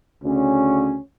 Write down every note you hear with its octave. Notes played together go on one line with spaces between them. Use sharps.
D2 C#3 C#4